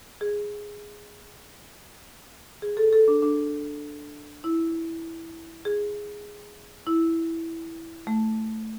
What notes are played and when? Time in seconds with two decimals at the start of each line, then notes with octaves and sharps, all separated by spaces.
0.21 G#4
2.62 G#4
2.77 A4
2.93 A4
3.08 D4
3.22 D4
4.44 E4
5.65 G#4
6.87 E4
8.07 A3